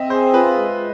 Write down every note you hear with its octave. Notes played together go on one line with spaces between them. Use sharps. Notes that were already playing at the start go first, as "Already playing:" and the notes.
Already playing: C4 D#5 E5
G#4 C5
F4 B4
G#3